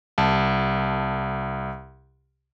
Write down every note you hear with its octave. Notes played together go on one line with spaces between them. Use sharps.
C2 A5